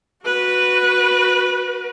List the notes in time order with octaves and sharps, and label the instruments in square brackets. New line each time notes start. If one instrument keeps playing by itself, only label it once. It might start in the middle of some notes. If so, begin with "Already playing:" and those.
[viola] F#4 B4